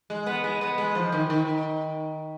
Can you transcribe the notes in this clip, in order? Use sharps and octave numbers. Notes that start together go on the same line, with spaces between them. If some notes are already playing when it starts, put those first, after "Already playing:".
G#3
B3
G#3
B3
G#3
F3
D#3
D#3